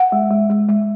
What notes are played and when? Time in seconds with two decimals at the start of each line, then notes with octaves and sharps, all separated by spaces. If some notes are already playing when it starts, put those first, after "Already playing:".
Already playing: F#5
0.12 G#3
0.31 G#3
0.50 G#3
0.69 G#3